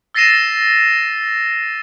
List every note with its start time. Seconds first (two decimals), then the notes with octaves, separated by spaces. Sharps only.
0.14 E6 A6 A#6 C7 D#7 E7